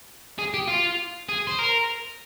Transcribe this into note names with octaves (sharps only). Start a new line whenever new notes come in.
G#4
G4
F4
G#4
C5
A#4